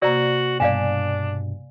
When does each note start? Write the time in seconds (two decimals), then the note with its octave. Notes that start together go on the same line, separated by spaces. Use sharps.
0.02 C3 A#3 F#4 D5
0.60 G2 B2 D4 D5 F5 G#5